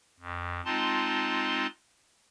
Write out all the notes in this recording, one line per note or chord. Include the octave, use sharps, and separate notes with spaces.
F2
G#3 C4 D#4 F4 A5 C6